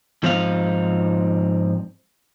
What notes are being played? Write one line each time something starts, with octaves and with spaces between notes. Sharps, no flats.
G#2 F3 C4 D#4 A4 F5